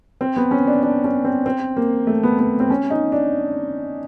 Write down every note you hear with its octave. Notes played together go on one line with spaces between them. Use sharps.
C4
B3
C#4
D4
D4
C#4
C4
C4
A#3
A3
B3
B3
C4
C#4
D#4
D4